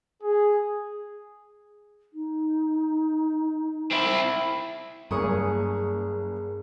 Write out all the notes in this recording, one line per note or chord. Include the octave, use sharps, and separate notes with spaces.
G#4
D#4
C4 E4
F#1 G2 G#4 C#6 D#6